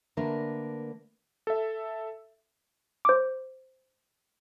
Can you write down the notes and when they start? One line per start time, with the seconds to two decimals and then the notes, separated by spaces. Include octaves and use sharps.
0.17 D3 A3 A#3 D4 A#4 B4
1.47 A4 E5
3.05 C5 D6